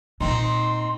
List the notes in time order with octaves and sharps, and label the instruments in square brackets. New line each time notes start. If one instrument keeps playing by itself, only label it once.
[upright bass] A#2 [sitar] C4 D#4 [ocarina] C6